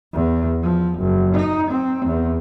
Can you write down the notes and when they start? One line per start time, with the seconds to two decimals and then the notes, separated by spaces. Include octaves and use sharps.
0.14 E2
0.63 F3
0.99 F#1
1.35 D#4
1.70 C4
2.06 E2